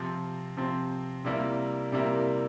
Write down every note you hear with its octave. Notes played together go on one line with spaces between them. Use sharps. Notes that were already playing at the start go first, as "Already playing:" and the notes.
Already playing: C3 F3 C4
C3 F3 C4
C3 G3 A#3 E4 A#4
C3 G3 A#3 E4 A#4